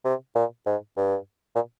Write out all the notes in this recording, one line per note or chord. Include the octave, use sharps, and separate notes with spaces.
C3
A#2
G#2
G2
A#2